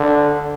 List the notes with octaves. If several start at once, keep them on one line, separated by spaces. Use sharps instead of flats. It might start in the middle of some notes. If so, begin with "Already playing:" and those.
Already playing: D3